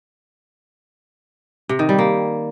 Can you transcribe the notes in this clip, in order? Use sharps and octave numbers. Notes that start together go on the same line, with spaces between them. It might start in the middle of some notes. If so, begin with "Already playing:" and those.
C3
D#3
G3
A#3